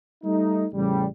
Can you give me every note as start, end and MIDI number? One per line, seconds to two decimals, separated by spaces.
0.23 0.64 55
0.23 0.64 57
0.23 0.64 63
0.73 1.05 33
0.73 1.05 49
0.73 1.05 55